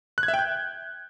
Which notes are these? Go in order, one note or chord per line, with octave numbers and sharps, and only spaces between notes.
F#6
G#6
E5
G5
G6